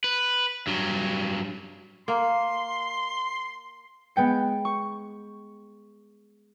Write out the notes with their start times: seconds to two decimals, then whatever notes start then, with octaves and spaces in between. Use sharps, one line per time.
0.04 B4
0.67 G2 F#3
2.08 A#3 C6
4.16 G#3 B3 G5 C#7
4.65 C#6